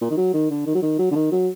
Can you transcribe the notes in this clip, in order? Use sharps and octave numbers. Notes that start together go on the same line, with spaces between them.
A#2
D#3
F#3
D#3
D3
D#3
F#3
D#3
F#3
D3
D#3
F#3